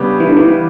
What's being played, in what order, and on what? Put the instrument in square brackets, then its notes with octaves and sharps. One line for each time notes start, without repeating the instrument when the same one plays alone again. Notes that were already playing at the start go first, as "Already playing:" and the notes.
Already playing: [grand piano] C#3 G3 B3 D4 G4
[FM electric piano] E3
D3
E3
E3